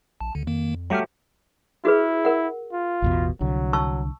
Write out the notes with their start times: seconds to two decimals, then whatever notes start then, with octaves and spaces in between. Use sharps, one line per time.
0.20 A#1 A5
0.35 D2 D3
0.47 F2 D#3 A#3
0.90 F#3 G3 A3 G4 F6
1.85 E4 F#4 G#4 B4
2.25 A#4 F#5
2.73 F4
3.02 A1 E2 B2
3.41 C2 D3 F#3
3.73 A5 C#6 E6